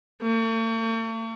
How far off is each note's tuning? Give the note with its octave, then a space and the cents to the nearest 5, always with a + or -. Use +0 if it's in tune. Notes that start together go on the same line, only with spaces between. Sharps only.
A3 +45